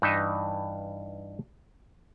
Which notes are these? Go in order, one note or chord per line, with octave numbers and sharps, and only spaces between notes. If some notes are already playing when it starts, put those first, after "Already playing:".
G2 E3 D#4 D#5 E5